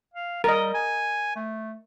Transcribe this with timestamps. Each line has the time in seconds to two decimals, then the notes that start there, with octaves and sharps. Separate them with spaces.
0.14 F5
0.44 G3 A#4 D#5
0.74 G#5
1.36 A3